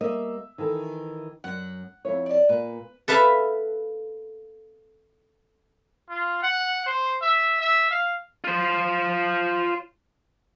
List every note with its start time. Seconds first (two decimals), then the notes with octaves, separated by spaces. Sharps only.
0.01 G3 A#3 D#5 E5
0.58 D#3 E3 A4
1.44 F#2 F#5
2.05 F2 E4 C#5
2.26 D5 A5
2.49 A#2 B4
3.08 A4 B4 E5 F5 A5
6.10 F4
6.43 F#5
6.86 C5
7.22 E5
7.61 E5
7.91 F5
8.44 F4 C5